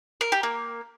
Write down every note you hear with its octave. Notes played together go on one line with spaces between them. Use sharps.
A#4
G4
A#3